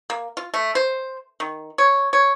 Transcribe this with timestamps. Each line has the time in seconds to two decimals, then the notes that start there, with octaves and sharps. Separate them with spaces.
0.10 A#3
0.37 F4
0.54 A3
0.75 C5
1.40 D#3
1.78 C#5
2.13 C#5